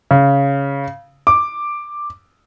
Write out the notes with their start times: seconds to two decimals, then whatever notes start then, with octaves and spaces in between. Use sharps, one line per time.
0.11 C#3
1.27 D6